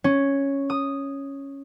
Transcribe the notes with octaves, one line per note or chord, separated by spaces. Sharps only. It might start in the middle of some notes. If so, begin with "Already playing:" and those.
C#4
D#6